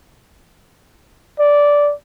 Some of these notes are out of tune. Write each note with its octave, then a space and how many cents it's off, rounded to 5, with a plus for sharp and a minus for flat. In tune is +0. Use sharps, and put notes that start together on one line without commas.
D5 -10